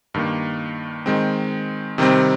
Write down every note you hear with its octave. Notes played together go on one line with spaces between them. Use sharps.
G2 D#3 A#3
D#3 G#3 C4
C3 D#3 G3 C4